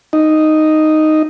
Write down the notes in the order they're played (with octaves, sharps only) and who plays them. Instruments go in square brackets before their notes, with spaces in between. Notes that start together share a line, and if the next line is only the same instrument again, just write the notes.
[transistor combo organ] D#4